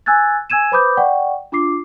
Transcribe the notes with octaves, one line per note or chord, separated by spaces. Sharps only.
G#5 E6 F#6 G#6 A6
G#5 E6 G#6 D#7 E7
B4 C5 B5 D6 D#6 G6
D5 F#5 G5 C#6
D4 F4 D6 C7